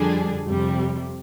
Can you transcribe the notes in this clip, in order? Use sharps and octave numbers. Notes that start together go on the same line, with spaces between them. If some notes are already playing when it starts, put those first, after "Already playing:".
Already playing: F2 D3 G3 D4 G#4
F2 C3 G3